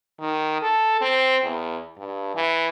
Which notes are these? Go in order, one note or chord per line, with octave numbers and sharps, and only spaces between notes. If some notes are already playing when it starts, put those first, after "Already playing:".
D#3
A4
C4
E2
G2
E3